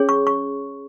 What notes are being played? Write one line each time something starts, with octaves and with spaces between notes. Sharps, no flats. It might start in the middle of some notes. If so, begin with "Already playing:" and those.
Already playing: C#4 G#4 C#5
C#6
C#6